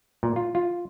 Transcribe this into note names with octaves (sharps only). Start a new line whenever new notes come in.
A#2
F4
F4